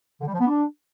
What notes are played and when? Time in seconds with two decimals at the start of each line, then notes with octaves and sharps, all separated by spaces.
0.21 D3
0.27 G3
0.34 F3
0.41 B3
0.47 D4